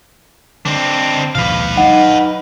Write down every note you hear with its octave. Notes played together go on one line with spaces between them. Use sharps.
D3 C4 D4
A#1 D#2 B2 B4 F5
F#3 D#4 F#5